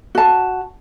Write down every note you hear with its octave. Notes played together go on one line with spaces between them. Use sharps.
F#4 A5